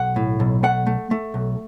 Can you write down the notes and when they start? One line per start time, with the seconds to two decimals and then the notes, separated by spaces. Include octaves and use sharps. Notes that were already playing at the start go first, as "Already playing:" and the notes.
Already playing: B1 F#5
0.16 A2
0.40 B1
0.63 A3 F#5
0.87 A3
1.11 A3
1.34 B1